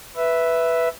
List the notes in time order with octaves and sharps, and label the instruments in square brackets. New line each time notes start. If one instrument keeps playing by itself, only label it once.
[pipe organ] B4 E5